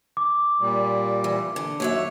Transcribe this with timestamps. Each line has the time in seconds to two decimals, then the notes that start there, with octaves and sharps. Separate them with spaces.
0.17 D6
0.60 A#2 G3
1.24 E3
1.56 D3
1.80 D#2 F#3 C#5 E5